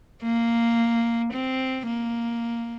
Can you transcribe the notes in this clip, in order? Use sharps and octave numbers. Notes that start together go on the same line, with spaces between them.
A#3
C4
A#3